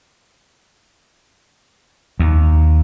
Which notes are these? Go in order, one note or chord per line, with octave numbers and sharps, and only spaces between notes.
D#2